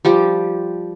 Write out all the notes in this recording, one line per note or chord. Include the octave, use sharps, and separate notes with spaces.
F3 G3 G4